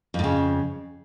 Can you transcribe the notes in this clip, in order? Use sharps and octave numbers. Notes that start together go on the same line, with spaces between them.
F2 A2 C#3